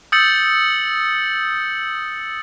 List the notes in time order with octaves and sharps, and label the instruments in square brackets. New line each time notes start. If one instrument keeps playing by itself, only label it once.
[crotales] D#6 E6 G6 A6 C#7 F#7